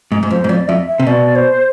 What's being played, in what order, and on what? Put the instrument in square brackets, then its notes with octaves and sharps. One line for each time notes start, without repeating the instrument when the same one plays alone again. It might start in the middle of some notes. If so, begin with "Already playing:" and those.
[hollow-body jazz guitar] G#2
G#2
[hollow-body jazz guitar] F2 [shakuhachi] C5
[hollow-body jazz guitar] G#2
[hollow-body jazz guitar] F2 [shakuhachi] D5
[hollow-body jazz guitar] F2 [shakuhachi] E5
[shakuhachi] E5
[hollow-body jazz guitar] C3
[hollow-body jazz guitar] B2 [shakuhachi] D5
[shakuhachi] C5